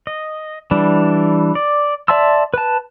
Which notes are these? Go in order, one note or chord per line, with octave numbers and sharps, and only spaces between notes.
D#5
E3 G3 D4
D5
D5 E5 A5 C6 E6
B4 A5